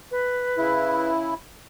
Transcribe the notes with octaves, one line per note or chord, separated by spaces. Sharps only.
B4
C#3 E4